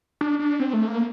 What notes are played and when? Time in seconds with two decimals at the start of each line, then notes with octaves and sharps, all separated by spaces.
0.21 D4
0.39 D4
0.60 C4
0.73 A3
0.88 A#3